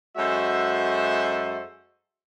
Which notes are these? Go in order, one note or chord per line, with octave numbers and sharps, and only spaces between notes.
F#2 G#3 F#4 A4 C5 E5